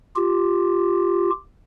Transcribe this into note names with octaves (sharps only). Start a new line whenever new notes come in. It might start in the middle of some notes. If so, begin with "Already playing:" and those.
F4 G4